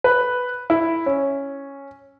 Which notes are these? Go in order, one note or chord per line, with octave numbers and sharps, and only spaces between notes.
B4
E4
C#4